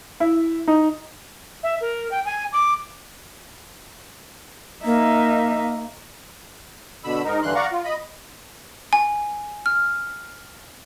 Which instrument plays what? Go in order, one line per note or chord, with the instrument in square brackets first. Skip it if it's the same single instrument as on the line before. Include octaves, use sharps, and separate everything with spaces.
[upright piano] E4
D#4
[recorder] E5
A#4
G5
G#5
D6
[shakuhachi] A#3 [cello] D#4 E5
[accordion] B2 D3 B5 E6
G#2 D#4 A#4
G2 D3 E3 C6 F#6
D5 F5 F#5 A#5 C#6
F4
D#5 B5
[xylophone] G#5
F6